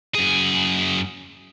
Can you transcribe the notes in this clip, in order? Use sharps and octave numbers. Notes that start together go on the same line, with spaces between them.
F#2 G#4